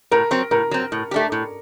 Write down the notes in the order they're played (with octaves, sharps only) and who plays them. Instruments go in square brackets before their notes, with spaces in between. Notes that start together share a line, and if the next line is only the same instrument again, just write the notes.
[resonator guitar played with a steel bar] A2 [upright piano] A#4
[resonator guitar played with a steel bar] F#3 C4
[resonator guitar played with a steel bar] A2 [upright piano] A#4
[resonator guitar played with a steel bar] F#3 C4
A2
A3 D4 G4
A2